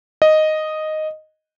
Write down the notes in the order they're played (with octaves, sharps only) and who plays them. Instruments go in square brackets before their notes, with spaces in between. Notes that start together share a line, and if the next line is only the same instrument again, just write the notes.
[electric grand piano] D#5